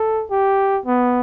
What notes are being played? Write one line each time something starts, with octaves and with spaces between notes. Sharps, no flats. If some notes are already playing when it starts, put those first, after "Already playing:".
Already playing: A4
G4
B3